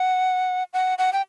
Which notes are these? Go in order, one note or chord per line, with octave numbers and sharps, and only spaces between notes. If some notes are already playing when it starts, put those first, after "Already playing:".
Already playing: F#5
F#5
F#5
G5